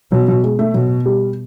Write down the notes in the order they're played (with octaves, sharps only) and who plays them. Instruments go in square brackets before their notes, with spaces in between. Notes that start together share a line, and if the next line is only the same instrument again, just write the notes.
[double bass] B2 [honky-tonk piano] F#3
[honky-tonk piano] F#3
G#3
A3
[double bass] B2 [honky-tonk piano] F#3
[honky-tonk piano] G3